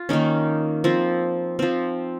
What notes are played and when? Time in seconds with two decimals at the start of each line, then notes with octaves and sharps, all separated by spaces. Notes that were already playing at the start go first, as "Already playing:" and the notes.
Already playing: F4
0.09 D#3 A#3 C#4 D#4
0.84 F3 C4
1.59 F3 C4